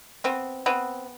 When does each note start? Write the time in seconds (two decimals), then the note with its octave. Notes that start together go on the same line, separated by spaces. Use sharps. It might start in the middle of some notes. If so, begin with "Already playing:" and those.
0.24 B3 C4
0.66 B3 C4